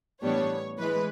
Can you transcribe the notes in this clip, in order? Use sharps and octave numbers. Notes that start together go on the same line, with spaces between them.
A2 E3 G3 B3 D4 C#5
E3 G#3 B4